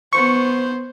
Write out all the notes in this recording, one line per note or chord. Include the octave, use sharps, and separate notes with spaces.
B3 C5 C#6